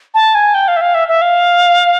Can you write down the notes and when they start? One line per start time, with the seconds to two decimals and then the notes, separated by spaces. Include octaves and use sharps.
0.14 A5
0.35 G#5
0.54 G5
0.68 F5
0.76 E5
0.81 F5
0.95 E5
1.08 E5
1.22 F5